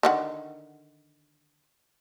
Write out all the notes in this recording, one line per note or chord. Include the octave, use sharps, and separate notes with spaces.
D3 D#3 F#5